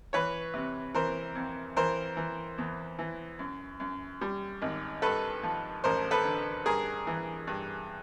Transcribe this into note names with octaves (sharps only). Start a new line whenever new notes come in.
E3 B4 C#5
C3
E3 A#4 C5
F2
E3 A#4 C5
E3
E2
E3
F#2
F#2
G3
G#1
G2 A4 B4
F3
A1 A#4 C5
A4 B4
D3
G2 G#4 A#4
E3
G2